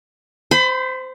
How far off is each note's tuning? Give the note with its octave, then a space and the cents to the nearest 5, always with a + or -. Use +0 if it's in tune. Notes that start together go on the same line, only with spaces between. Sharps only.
C5 -15 B5 +25